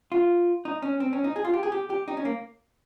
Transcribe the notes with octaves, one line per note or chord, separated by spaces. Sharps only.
F4
D#4
C#4
C4
C#4
D#4
G#4
F4
G4
G#4
G4
G4
D#4
C#4
A#3